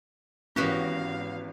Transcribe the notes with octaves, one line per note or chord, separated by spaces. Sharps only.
G#1 E3 B3 C#4 F#4 G4 F5 A#6